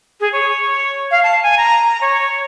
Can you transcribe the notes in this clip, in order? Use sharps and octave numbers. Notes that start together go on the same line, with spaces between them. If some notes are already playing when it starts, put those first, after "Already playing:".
G#4
C#5
F5
A5
G#5
A#5
C#5